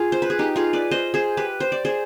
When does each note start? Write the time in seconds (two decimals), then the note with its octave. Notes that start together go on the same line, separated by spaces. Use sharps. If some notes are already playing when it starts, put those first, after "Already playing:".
Already playing: F4 G#4
0.12 C5
0.22 B4
0.30 G#4
0.39 D#4 G4
0.56 F4 G#4
0.73 B4 D5
0.91 C5 D#5
1.14 G#4 C5
1.37 G4 B4
1.60 C5
1.72 D5
1.85 G#4 C5